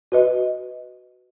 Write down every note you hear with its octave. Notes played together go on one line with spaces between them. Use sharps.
F#4 B4 D#5